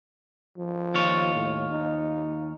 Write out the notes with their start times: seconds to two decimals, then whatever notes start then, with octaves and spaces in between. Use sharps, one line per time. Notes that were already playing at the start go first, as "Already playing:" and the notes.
0.57 F3
0.94 D#2 F4 C#5
1.35 A2
1.71 D#4